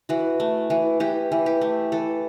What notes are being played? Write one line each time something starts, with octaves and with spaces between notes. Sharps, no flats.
E3 F#4
A3
E3
E3 G4
E3
G4
A3
E3 A4